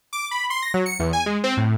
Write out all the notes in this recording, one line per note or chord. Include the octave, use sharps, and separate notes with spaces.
D6
B5
C6
A#6
F#3
C#7
E2
G#5
G#3
C4
A2